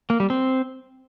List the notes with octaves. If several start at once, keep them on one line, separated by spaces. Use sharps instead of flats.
A#3
G3
C4